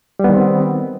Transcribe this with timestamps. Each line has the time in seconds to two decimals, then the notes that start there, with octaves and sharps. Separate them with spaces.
0.19 G3
0.24 B3
0.29 D#3
0.34 C4